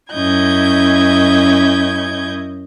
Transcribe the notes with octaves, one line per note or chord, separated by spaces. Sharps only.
F#2 C#4 E4 D#5 G6 G#6